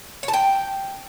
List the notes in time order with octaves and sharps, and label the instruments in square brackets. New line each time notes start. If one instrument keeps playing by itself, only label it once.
[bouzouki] C#5
A5
G5